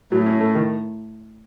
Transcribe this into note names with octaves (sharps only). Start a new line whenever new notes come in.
A2 F#3
C#4
A3
D#3